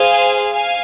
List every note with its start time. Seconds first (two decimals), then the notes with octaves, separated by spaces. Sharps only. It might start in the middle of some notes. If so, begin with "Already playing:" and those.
Already playing: G#4 C5 F5 G#5
0.52 F5 G#5